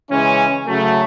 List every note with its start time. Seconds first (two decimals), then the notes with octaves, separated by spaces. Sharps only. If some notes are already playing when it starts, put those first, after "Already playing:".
0.11 C#3 E3 G#3 C#4
0.67 C#3 F#3 A3